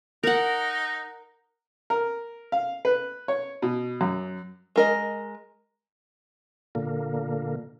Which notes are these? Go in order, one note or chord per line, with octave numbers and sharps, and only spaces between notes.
D#4 A#4 F#5
A#4
F5
B4
C#5
B2
F#2
G#3 A#4 D#5
A#2 D3 A#3